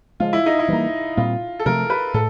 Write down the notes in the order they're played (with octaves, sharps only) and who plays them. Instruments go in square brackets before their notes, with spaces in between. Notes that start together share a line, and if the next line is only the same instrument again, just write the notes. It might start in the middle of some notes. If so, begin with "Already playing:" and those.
[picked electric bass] C#3 F3 G#3 [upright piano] F4
[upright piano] E4
D#4
E4
[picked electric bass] E3 G3 A#3
[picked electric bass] A#2 G3 C4 [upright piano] F4
[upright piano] A4
[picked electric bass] C3 F3 A3 [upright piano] A#4
[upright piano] B4
[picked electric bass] A2 [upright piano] A4